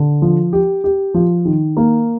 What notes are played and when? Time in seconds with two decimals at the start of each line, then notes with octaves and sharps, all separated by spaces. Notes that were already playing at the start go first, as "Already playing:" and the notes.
Already playing: D3
0.22 F3
0.53 G4
0.84 G4
1.14 F3
1.45 D#3
1.77 A#3